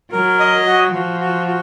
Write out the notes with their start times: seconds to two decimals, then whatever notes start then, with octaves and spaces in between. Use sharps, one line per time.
0.12 F#3 A#4
0.40 D#5
0.66 F#4
0.93 F3 F#4
1.20 F#4
1.47 F#4